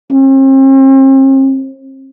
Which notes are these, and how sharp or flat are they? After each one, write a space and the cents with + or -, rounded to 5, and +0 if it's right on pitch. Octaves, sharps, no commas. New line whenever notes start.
C4 +45